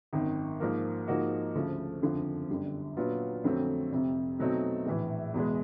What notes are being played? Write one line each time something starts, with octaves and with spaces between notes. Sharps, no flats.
G#1 F#2 D#3
G#2 F3 A#3
G#2 F3 A#3 D#4 F#4
D2 C#3 F3 A3
F#1 F2 D3 F3
G1 F#2 D3 G3
A#2 F#3 B3 D4 F4
F2 D3 F#3 A3 C4
F1 F2 C3
B2 F#3 A3 C4 D#4
A#1 A2 E3
E2 B2 G#3